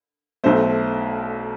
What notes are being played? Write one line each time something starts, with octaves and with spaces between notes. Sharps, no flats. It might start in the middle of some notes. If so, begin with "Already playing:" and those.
B1 B2 A3 C5